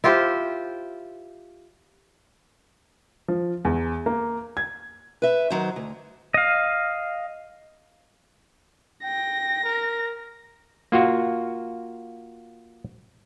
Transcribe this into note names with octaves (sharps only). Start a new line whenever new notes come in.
E4 F4 G4 C5
F3
E2
A#3
G#6
B4 E5
D#3 F#3 C5
D2
D#5 F5
G5 A#6
A#4
A#3 F4 F#4